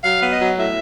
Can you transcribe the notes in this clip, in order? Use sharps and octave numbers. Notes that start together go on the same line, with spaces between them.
F#3 F5
B3
D#5
F#3
A2 E5